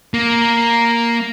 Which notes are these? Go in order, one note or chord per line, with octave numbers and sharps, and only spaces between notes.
A#3